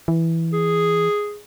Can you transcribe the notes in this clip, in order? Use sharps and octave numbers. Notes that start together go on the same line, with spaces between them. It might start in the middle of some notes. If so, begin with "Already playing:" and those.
E3
G#4